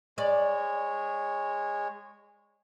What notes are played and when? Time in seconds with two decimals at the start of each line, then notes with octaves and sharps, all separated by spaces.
0.18 G#3 C#5 D5